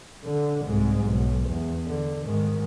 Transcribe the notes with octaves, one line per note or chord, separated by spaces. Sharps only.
D3
C2 G#2
B1
E2
D3
G#2 D#3